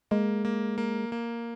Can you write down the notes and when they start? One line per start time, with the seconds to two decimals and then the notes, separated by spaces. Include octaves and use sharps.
0.11 G#3 A#3
0.45 A#3
0.78 A#3
1.12 A#3